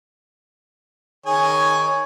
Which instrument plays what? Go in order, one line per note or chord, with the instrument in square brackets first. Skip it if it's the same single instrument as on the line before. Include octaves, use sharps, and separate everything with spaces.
[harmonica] D#3 G#4 G#5 [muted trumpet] C#5